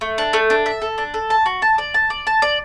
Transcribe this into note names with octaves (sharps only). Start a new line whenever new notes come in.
A3
D4
A3
D4
E5
A4
D4
A4
A5
F#4
A5
D5
A5
D5
A5
D5